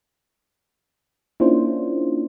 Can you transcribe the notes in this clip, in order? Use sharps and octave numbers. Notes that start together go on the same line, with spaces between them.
A#3 C#4 D4 E4 F4 C5